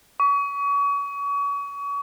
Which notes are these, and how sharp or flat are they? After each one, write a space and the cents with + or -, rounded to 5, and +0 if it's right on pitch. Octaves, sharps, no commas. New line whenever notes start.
C#6 +35